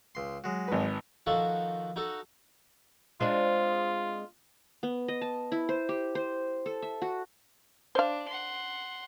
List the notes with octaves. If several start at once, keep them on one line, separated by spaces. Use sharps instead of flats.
C#2 C6
F#3 G#3
G#1 B4
D#3 F3 F#4 A4
D#4 F#4 A4
G#3 C4 D4 F4
B3
D#5
A5
E4
C5
G4
C5
A4
E5
F#4
D4 C5 F5
F#5 C6